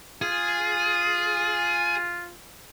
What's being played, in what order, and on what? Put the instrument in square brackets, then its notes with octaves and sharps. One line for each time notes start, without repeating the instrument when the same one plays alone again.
[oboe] F4 [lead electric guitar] G#4